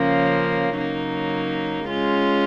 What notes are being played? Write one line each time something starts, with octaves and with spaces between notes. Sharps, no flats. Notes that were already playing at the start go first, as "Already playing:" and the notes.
Already playing: C#3 F3 A#3 C#4
C#3 F#3 A#3 D#4
G#3 C#4 F4